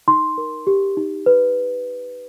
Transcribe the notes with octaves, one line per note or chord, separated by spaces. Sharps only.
D#4 C6
A#4
G4
D#4
B4